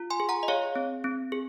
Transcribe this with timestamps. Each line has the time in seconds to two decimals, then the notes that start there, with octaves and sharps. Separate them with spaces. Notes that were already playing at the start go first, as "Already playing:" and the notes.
Already playing: F4
0.10 G#5 C6
0.20 G#4
0.29 F#5 A#5
0.43 D#5
0.48 G#4 C#5 F5
0.75 C4
1.04 C4
1.32 G#4